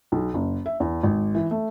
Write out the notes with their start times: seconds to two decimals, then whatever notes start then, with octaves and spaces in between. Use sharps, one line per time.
0.12 B1
0.34 F#1
0.66 E5
0.80 E2
1.03 G#1
1.35 E3
1.51 A3